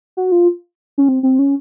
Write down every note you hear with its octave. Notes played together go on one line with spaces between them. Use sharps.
F#4
F4
C#4
C4
C4
C#4